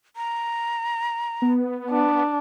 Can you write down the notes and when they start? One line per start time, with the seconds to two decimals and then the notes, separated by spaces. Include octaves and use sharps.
0.16 A#5
1.42 B3
1.91 D4